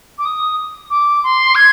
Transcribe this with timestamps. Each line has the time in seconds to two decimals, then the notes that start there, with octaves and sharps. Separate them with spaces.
0.18 D6
0.25 D#6
0.90 D6
1.23 C6
1.55 G#6